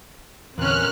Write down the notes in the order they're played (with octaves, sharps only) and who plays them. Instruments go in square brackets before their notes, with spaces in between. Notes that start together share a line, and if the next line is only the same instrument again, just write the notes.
[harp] G1 A#2 [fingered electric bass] E2 [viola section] C4 C#4 [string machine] F6 F#6